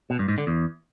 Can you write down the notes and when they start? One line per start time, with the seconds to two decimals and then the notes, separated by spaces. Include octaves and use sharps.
0.10 B2
0.19 G2
0.29 G#2
0.38 D3
0.47 E2